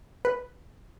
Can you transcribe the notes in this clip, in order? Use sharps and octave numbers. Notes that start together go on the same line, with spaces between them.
B4